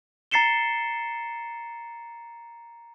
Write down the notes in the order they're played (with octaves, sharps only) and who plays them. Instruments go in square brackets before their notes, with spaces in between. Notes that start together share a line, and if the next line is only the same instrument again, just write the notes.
[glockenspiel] A#5 A6 C7 C#7 E7 G7